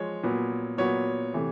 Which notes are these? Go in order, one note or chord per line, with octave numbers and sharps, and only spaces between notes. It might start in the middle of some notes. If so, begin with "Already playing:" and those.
Already playing: F3 G#3 C#5
A#2 F#3 B3
A#2 F#3 B3 C#5
C3 E3 A3